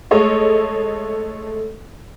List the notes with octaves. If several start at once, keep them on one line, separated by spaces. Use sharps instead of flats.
G#3 A3 A4 C#5 D#5